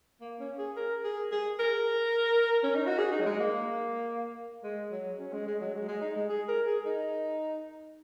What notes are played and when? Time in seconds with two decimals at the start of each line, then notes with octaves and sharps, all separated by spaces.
0.21 A#3
0.40 C#4
0.58 G#4
0.77 A#4
1.04 G#4
1.32 G#4
1.59 A#4
2.64 C#4
2.75 D#4
2.87 F#4
2.99 G#4
3.12 D#4
3.21 F#3
3.26 G#3
3.39 A#3
4.63 G#3
4.91 F#3
5.20 C#4
5.32 G#3
5.47 G#3
5.61 F#3
5.74 G#3
5.88 G#3
6.02 D#4
6.16 G#3
6.30 G#4
6.48 A#4
6.67 G#4
6.86 D#4